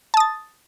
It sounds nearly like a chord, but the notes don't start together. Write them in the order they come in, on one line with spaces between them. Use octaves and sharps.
A5 D#6 A6